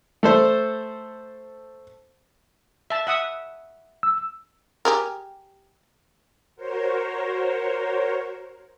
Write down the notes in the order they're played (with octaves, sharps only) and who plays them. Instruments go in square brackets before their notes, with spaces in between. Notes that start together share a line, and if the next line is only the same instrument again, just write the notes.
[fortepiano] A3 A4 C5
[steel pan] E5 A5
E5 F#5 D#6
[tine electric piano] E6
[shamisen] G4 G#4 A#4
[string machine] F#4 A#4 C5 C#5